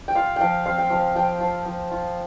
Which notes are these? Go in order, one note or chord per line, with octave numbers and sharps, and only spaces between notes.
G5
F4 F5
F3 F5 G5
C4 F5
G5
F3 F5
F3 G5
F3
F3
F4